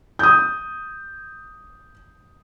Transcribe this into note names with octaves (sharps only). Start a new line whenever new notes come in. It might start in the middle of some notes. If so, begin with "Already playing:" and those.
D#6 G6